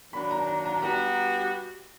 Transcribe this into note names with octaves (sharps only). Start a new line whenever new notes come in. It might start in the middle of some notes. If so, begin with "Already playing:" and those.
D#3 F#3 A#3 D4 B5
A#5
A#5
A#5
G3 B3 D4 F#4 A#5